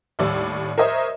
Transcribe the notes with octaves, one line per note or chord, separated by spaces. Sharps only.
D#2 A2 G3 D5 E6
A#4 C5 C#5 D#5 E5